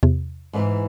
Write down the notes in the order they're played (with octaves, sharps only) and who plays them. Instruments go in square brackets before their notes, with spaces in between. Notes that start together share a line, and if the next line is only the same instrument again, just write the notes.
[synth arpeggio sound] E2 C3
[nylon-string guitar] G#2 E3